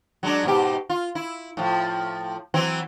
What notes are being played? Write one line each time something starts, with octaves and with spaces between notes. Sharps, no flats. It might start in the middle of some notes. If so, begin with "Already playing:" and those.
F#3 G#3 D4
G#2 B2 G4
F4
E4
A2 F3
E3 F#3 C4